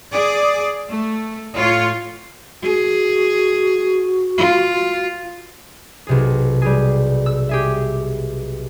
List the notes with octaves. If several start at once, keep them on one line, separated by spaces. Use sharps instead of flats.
G#4 D5
A3
A2 F4 C#5
F#4 G#4
F4
B1 C3 G#4
G3 G#4
E6
G4 G#4 E5